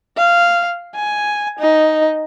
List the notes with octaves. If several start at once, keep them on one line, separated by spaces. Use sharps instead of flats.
F5
G#5
D#4